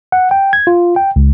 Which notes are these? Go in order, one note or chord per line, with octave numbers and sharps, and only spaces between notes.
F#5
G5
G#6
F4
G5
C#2